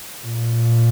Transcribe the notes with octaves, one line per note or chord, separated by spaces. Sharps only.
A#2